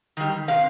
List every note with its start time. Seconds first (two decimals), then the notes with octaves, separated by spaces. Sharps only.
0.17 D#3 G3
0.48 C3 F5